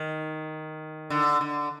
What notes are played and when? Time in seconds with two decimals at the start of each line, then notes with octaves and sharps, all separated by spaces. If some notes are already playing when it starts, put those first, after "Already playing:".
Already playing: D#3
1.10 D3
1.41 D3